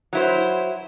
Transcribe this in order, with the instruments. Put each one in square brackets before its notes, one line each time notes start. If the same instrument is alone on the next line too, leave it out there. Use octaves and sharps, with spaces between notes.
[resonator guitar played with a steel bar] F#3 E4 C5